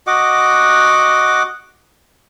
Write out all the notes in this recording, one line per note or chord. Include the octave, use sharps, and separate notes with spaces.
F#4 D#5 F#5 D6